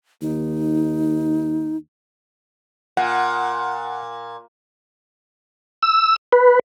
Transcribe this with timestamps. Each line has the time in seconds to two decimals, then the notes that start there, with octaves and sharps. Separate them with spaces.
0.22 D#2 D#4
2.97 A#2 F#5
5.83 E6
6.33 B4